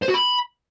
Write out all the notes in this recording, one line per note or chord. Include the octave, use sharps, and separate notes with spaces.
C5
F#4
B5